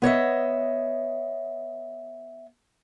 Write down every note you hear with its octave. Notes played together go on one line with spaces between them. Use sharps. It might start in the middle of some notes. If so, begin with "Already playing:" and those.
B3 C#5 D#5 E5